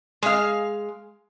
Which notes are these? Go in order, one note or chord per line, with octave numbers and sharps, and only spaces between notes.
G#3 F5